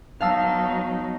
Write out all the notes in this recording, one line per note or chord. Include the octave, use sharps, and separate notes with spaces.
F#3 B3 D#4 F5 A5 E6